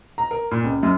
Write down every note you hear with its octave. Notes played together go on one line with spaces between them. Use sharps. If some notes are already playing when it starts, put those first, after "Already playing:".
A#5
A#4
A#2
C#2
F#2